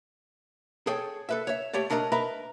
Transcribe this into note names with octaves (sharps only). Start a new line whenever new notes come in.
G#4 A4 C#5 G5
A4 B4 E5
C#5 E5
A3 G4 C#5 D5
A3 D4 A#4 D#5 A#5
A#4 B4 D#5 E5 A#5 B5